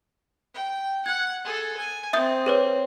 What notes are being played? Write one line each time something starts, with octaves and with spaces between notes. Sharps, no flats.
G5
F#5 G#6
G#4 A4
G#5
C4 E5 D#6 G6
G#4 B4 C#5